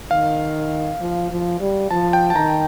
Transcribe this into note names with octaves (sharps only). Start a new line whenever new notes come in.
D#3 F5
F3
F3
G3
F3 A5
G5
A5
D#3 A#5